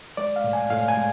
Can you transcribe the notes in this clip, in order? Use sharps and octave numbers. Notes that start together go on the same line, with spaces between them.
G#3 D5
F5
A2
G#5
A2 F5
G#5
G#3